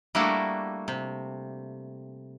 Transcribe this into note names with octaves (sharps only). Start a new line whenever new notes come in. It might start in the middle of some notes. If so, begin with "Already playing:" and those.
G3 A3 A#3 D4 E4 F#4
C3